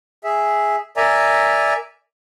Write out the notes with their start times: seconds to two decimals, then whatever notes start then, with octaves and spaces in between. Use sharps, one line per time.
0.24 G#4 E5
0.97 A#4 D5 E5 G#5 A#5